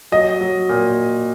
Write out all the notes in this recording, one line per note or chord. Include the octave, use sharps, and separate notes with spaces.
F#3 D#5
F#3
A#2